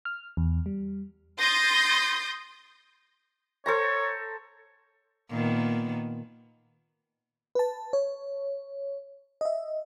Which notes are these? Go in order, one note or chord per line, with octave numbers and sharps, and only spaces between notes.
F6
E2
G3
C6 D#6 G6 A6 A#6
A4 C5 C#5 A#5
A#2 D#3 B3
B4 A5
C#5
D#5 E5